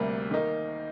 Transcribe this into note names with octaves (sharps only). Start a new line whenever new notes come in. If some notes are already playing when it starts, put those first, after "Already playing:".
Already playing: D2 C3 G3 A#3
D#3 A#3 D#4